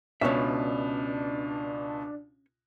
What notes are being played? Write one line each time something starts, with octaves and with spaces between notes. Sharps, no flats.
C#2 B2 C#4 D4 E5